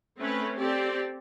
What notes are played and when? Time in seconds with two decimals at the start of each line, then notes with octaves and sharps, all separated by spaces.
0.20 A3 C4 C#4 B4
0.58 C4 G4 A4 D5